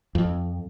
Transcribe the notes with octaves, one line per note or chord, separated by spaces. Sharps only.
F2